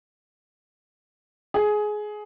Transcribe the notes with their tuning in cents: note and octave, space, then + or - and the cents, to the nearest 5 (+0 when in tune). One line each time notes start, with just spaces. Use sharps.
G#4 +15